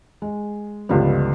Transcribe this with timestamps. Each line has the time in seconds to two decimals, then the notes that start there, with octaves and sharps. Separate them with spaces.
0.22 G#3
0.89 C#2 G2 D3 F3 G3 B3